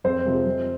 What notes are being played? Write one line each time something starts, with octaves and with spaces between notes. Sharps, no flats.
F2 C4 C5
C3 F3 G#3
F2